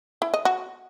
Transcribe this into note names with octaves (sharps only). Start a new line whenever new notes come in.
E4
D#5
F#4